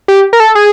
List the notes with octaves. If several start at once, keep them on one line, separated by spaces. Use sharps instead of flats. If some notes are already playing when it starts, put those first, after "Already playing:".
G4
A#4
A4
G#4